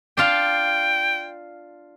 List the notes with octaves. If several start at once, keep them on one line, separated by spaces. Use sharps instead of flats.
D4 F4 F5 G5